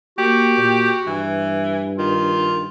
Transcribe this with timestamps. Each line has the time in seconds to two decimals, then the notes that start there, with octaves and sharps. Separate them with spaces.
0.18 A#3 F#4 G4
0.57 A#2
1.07 G2 E3
1.98 D#3 F4